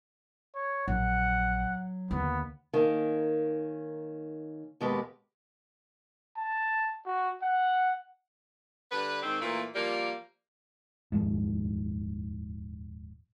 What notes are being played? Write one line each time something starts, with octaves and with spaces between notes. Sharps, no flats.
C#5
A#1 F#3 F#5
D#2 D3 B3
D#3 A#3 C#4
D#2 B2 G#3 G4 B4
A5
F#4
F#5
D3 G3 B4
G#2 D#3 C4
A#2 E3 A3 A#3
F3 G3 A#3
D#1 F2 G#2